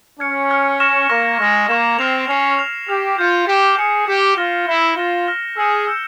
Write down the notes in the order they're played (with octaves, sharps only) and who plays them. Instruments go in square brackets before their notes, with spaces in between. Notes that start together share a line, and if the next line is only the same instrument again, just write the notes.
[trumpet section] C#4 [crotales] F6 G#6 C#7
[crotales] F6 G#6 C#7
C#6 F6 A#6 E7
[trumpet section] A#3 [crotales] C#6 F6 A#6 E7
[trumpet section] G#3 [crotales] C#6 F6 A#6 E7
[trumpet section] A#3 [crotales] C#6 F6 A#6 E7
[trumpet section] C4 [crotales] F6 C7 F7
[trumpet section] C#4 [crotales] F6 C7 F7
[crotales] F6 C7 F7
[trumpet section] G4 [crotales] F6 C7 F7
[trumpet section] F4 [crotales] G6 C#7 E7
[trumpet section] G4 [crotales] G6 C#7 E7
[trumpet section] G#4 [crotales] G6 C#7 E7
[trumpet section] G4 [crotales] G6 C#7 E7
[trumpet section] F4 [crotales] F6 A#6 E7 G7
[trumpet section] E4 [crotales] F6 A#6 E7 G7
[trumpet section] F4 [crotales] F6 A#6 E7 G7
[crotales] F6 A#6 E7 G7
[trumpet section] G#4 [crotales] E6 G6 C#7 E7
[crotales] E6 G6 C#7 E7